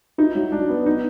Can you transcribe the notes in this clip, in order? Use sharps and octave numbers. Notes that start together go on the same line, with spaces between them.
D#4 E4
F#3
F#3 D4
B3
B3 D#4